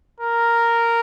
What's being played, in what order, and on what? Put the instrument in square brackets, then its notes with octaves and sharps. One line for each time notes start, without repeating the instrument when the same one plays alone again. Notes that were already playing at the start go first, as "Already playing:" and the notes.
[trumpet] A#4